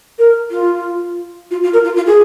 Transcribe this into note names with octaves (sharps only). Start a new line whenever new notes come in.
A#4
F4
F4
F4
A#4
F4
F4
G#4